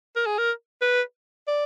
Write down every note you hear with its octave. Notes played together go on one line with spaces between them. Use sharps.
A#4
G#4
A#4
B4
D5